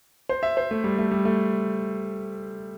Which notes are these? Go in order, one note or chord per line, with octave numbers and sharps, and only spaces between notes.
C5
E5
C5
A3
G3
A3
G3
A3